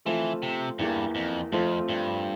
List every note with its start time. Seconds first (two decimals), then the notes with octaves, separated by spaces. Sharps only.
0.05 E3 F3 A3 C4 F4 A4
0.43 C3
0.79 E2 G2 E3 A#3
1.15 F2
1.52 F2 F3 A3 C4 F4
1.89 G2